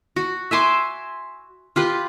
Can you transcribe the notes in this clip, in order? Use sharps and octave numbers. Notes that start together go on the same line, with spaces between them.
F#4
E5 G#5 C6 D6
F4 G4 B4